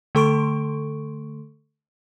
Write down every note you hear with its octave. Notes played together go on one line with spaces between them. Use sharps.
D3 A3 A4 C6 C#6 D7